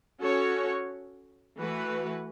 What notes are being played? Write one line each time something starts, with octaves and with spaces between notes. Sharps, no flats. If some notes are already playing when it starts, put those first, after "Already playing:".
C#4 F#4 A4 C#5
E3 A3 F#4 B4